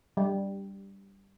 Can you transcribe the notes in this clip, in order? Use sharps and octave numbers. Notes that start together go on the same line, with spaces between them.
G3